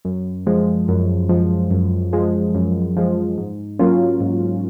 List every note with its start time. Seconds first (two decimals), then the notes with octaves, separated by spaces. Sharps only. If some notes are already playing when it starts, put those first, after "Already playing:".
0.05 F#2
0.47 F3 G#3
0.88 F#2
1.29 F3 G#3
1.71 F#2
2.13 F3 G#3
2.55 F#2
2.97 F3 G#3
3.38 G#2
3.79 F#3 A#3 C#4 F4
4.21 G#2